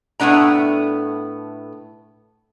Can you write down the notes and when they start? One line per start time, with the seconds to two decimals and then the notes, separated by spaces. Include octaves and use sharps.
0.20 A2 A3 B3 D4 A#5